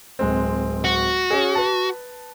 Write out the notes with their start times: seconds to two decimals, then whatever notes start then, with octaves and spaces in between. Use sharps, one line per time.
0.19 D1 G#3 C4
0.84 F#4
1.31 C#4 G#4
1.55 B4 A5